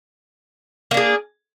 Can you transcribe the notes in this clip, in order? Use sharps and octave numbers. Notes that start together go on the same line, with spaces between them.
A#3 D4 G#4